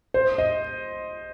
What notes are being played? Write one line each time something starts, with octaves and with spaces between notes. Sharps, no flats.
C5
D#5